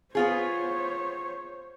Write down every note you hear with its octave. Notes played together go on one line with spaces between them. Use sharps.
B3 F4 G#4 C5 C#5